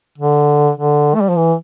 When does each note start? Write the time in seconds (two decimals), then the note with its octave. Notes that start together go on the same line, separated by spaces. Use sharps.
0.18 D3
0.77 D3
1.15 A3
1.21 G3
1.29 F3
1.36 E3